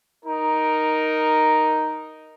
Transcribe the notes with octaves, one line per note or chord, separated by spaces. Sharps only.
D#4 A#4